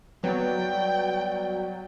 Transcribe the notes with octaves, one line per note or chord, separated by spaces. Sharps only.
F#3 G3 B3 C#5 D5 G5